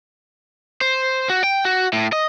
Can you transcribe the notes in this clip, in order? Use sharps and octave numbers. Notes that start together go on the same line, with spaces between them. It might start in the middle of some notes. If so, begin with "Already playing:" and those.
C5
F#4
G5
F#4
A2
D#5